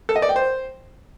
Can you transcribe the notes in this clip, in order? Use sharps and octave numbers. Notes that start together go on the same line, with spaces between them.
A4
D#5
D5
G5
C5